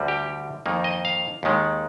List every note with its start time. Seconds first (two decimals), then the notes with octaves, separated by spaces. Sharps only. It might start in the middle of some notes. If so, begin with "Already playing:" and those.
Already playing: D2 D3 G3
0.08 G4
0.66 F2 D#3 A#3
0.84 D#5
1.05 F5
1.43 D#2 D#3 G#3